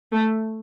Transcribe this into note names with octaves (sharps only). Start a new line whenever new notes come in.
A3